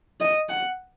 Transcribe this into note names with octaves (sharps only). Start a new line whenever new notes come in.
D#5
F#5